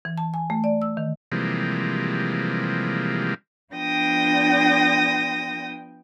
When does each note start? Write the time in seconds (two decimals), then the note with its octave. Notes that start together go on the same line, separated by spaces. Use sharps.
0.05 E3
0.18 A5
0.34 G#5
0.50 A3
0.64 D5
0.82 E6
0.97 D#3
1.32 C3 E3 F3 G3 G#3 A#3
3.74 F3 B3 D4 G5 D#6 A#6